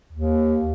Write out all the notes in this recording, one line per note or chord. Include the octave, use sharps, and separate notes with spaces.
D#2